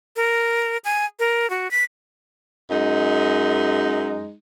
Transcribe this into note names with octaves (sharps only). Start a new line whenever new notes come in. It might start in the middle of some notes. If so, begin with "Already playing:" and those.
A#4
G#5
A#4
F#4
B6
F#2 G#3 D#4